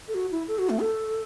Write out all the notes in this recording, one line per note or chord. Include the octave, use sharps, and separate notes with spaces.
A4
F#4
E4
A4
F#4
A3
A4